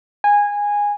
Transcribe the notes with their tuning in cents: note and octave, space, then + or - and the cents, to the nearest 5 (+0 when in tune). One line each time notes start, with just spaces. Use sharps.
G#5 -15